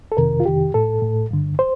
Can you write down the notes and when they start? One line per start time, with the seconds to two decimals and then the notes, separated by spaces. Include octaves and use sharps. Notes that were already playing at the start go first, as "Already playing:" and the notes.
0.12 A4
0.17 F2 C3 D#3 A#4
0.40 F4
0.46 F2 C3 D#3 G4
0.74 A2 A4
1.02 A2
1.31 G2 D3
1.59 C5